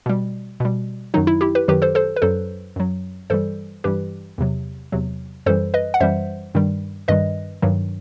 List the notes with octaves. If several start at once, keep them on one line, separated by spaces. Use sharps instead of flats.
B2 G3
B2 G3
F#2 D#3 F#3 D#4
E4
E4 G4
G4 B4
F#2 D#3 F#3 G4 B4
A4 C5
A4 C5
B4
F#2 F#3 A4 C5
F#2 F#3
G2 E3 G3 A4 C5
G2 E3 G3 G4 B4
E2 C3 F#3
E2 C3 F#3
F#2 E3 G3 A4 C5
B4 D#5
F#5
F#2 E3 G3 C5 E5
G2 D#3 G3
G2 D#3 G3 B4 D#5
G2 D#3 F#3